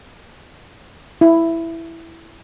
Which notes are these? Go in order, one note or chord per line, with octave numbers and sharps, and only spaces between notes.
E4